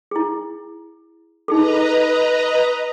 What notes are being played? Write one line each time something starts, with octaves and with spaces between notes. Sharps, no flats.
E4 G#4
D#4 G#4 A4 B4 D#5 A#5